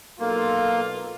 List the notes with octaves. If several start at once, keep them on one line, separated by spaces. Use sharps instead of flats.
B1 A#3 F4 A4